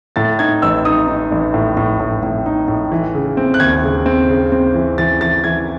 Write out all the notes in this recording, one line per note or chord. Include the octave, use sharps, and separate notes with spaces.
A2 A6
D#4 G#6
A1 E6
D#4 D#6
D#4
A1
A2
A2
A2
A2
D#4
A2
E3
C#3
C4
F#6
D#2 G#6
C#3
C4
C#3
C4
E3
E3 A6
E3 A6
E3 G#6